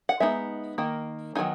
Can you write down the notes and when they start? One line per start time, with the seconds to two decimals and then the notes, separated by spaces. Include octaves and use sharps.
0.09 F#5
0.20 G#3 B3 D#4 E5
0.78 D#3 A#3
1.35 D#3 F#3 B3 D#4 G#5